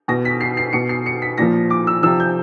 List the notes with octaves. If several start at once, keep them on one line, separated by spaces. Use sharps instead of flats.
B2 A#6
B6
C7
C7
B2 C#7
C7
C#7
B6
A#2 F3 A#6
D6
E6
C3 F3 E6
G6